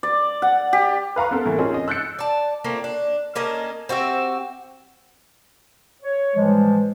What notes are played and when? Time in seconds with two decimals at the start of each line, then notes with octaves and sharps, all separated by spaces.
0.03 D5
0.42 F#5
0.73 G4
1.16 B4 F5 A#5 C#6
1.31 B3 C4 A4 A#4
1.45 A2 E3 A#3
1.58 C4 C#4 D#4 F4 G#4
1.74 D#5
1.88 E6 F#6 G6 A6 C#7
2.19 D5 A5
2.64 A3 A#3 C4 F4
2.84 D4
3.36 A#3 C#4 D4 D#5
3.89 C4 F#4 G4 E5
6.02 C#5
6.36 A2 E3 F3 G3 G#3